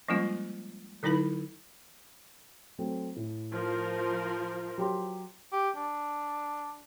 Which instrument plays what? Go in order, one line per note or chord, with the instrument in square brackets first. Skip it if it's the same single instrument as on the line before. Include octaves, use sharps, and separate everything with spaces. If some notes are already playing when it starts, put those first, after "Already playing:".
[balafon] F3 G3 G#3 A#3 C#4 F4
D3 F#3 D#4 E4 B4 B5
[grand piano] F#3 A3 C4
A2
[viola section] F3 A#4 C5
[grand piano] F#3 G4 C6
[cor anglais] G4
D4